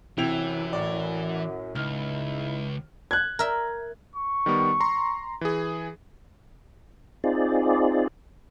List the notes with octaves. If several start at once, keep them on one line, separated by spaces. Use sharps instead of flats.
F#2 C3 E3 E4 G5 F7
A2 D5
C#2 D#4 E4 F6
F#6 G#6
A#4 E5
C#6
D#3 G3 B3
A#5 C6
E3 G#4
C4 D#4 F4 G#4 D5